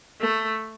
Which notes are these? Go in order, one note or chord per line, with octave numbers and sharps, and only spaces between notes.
A3